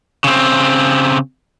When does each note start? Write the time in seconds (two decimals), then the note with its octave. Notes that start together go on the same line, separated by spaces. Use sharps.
0.24 C#3 C4